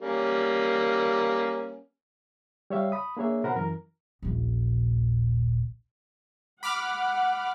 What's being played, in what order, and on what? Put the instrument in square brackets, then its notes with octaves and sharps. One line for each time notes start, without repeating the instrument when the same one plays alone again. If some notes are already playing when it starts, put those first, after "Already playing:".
[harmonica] G3 A#3 C#4
[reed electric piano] G3 C#5 E5 F5
B5 D#6
A#3 D4 G#4 C#5 E5
B2 A#4 C5 F#5 B5
F#2 E3 A#4
[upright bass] D#1 A#1
[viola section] F#5 [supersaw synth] B5 D6 F6